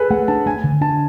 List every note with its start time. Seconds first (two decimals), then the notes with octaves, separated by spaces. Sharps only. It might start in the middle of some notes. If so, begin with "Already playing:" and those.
Already playing: G#4 A4 B4
0.10 A3 F#5
0.28 D4 A5
0.46 A3 G#5
0.64 D3
0.81 D4 A5